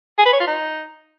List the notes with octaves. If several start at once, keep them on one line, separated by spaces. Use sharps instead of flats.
G#4
B4
C#5
F4
D#4